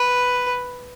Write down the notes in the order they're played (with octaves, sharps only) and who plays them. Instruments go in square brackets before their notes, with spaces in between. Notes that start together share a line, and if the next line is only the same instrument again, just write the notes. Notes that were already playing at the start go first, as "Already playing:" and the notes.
Already playing: [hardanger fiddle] B4